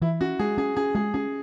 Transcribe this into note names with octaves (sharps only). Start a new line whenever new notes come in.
E3 E4
C#4 F#4
G#3 G#4
C#4 G#4
C#4 G#4
G#3 G#4
C#4 G#4